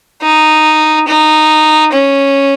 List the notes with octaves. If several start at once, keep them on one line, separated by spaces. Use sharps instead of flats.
D#4
D#4
C#4